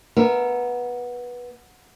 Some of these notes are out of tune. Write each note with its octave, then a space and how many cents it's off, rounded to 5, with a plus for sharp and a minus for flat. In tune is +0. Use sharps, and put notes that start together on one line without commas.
B3 -15 A#4 +0 E5 +20